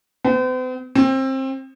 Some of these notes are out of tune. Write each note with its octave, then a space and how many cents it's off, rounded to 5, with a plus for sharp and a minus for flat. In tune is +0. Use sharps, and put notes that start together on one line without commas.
C4 -45
C4 +25